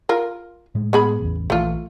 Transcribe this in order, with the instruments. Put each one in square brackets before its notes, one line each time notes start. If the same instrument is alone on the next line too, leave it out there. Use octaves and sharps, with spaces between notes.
[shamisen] F4 A#4
[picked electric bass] A2 G#3
[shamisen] B3 G#4 B5
[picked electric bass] A1 E2
[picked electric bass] A#1 E3 [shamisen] A3 F4